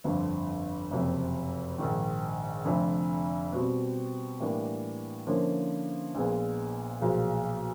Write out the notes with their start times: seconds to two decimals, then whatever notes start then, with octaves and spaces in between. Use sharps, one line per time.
0.04 G1 F2 D3
0.90 F#1 F2 C3
1.78 A#1 G#2 D#3
2.65 F1 F2 D3
3.52 B2 G3 C4
4.40 A2 E3 G3 A#3 D4
5.27 D3 F3 A#3 C#4 E4
6.14 A#1 A#2 F3 G#3 B3
7.01 B1 A#2 F3 G#3